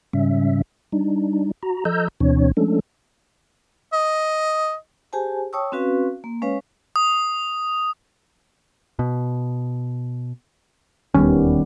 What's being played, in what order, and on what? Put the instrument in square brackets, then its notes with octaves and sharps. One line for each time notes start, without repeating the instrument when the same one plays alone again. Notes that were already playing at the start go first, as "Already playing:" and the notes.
[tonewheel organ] G#2 C#3 G3 C#4 E5
G3 D4 D#4
F#4 A#5
F3 A4 D#5 A#5 E6 G6
D2 B2 E3 C4 D4 C#5
F3 G#3 A3 C#4 D4 A4
[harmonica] D#5
[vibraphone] G4 G#4 C5 G#5 A5
C#5 G5 A5 C#6 D#6 E6
C4 C#4 F#4 B4 F5
A#3
G#3 C#4 B4 C#5 F5
[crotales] D#6
[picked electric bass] B2
[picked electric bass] E1 D#2 C#4 [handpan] D#3 G3 B3